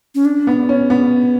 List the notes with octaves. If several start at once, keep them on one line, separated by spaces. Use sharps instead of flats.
C#4
D4
B3
C#4
B3